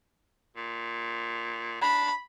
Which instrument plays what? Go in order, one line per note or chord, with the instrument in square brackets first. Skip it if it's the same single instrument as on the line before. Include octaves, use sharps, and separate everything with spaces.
[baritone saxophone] A#2
[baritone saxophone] D4 [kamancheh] B5